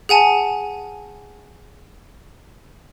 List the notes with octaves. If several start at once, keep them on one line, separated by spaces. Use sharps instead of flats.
G#4 F#5 G#5 A5